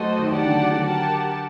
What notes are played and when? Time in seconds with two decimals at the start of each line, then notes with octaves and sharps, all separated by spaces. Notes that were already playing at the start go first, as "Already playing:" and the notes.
Already playing: F#3 A3 F#4 A4 C5 D#5
0.19 D#3
0.31 D#3 G4 D5 F#5 A5
0.44 D3 F#3
0.71 D3 F#3
0.84 G4 A#4 F#5 A5